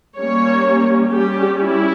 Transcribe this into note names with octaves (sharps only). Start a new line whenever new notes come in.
G3 A#3 C#4 C#5
G3 C#4 G4
E4